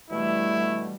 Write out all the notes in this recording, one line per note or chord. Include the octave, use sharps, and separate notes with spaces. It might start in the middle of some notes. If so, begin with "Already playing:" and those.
B2 D3 E3 G3 A3 E4